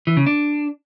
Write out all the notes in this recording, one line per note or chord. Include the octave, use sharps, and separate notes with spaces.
E3
C#3
D4